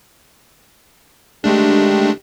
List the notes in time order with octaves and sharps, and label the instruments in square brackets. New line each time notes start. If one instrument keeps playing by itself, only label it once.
[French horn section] D3 D#3 G4 [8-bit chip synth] G#3 A3 D4